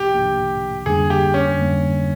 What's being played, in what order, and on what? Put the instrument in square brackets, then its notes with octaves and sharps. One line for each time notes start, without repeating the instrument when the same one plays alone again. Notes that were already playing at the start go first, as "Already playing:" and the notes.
Already playing: [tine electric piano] C2 C3 F3 A#3 D4 [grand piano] G4
[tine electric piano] C2 C3 F3 A#3 D4
[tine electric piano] F2 D3 G3 A#3 D4 [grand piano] G#4
[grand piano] G4
C#4
[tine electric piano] F2 D3 G3 A#3 D4